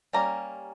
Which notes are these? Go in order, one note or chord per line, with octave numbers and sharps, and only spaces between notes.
G3 A#3 C#4 A#5